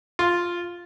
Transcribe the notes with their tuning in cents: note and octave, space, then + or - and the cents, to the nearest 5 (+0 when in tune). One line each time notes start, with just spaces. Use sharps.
F4 +0